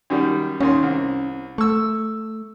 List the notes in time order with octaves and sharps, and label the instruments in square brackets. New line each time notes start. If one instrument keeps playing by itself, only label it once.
[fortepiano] F#2 D#3 G3
[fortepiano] D#2 D#3 C6 [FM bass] C#4
[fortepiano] C2
[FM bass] A3 [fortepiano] C#6 E6